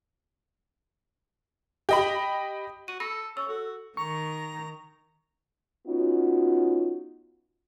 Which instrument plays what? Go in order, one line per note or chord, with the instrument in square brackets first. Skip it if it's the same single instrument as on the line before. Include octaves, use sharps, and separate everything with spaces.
[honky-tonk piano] G4 D#5 B5
[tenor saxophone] F#4 [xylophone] D#7
[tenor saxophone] A4 [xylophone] B5 A#6 D#7
[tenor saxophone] C#4 [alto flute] C#6 [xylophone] E6
[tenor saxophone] F#4 [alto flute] A4
[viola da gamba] D#3 [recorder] A#5 [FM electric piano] C#6
[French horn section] B3 C#4 D#4 F4 F#4